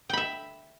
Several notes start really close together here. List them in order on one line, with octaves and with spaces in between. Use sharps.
G5 B5 E5